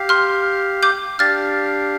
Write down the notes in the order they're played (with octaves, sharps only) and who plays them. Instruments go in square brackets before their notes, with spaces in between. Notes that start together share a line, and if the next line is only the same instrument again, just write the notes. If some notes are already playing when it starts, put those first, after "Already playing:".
Already playing: [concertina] G4 F5
[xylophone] C6 F6
D6 G6
[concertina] D4 G4 F5 [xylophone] F6 A6